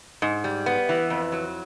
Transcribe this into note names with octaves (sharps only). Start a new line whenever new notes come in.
G#2
G3
B3
E3
F2
F#3